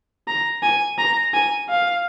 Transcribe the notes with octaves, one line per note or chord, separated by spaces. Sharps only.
A#5
G#5
A#5
G#5
F5